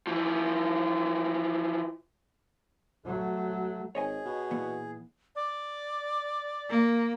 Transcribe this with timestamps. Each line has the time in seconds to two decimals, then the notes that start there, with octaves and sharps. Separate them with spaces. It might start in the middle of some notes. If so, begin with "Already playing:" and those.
0.07 E3 F3
3.06 F#3 A3
3.95 G#1 G#4 C#5 D#5 G#5
4.25 B2
4.51 A#2 E3 B3
5.36 D5
6.69 A#3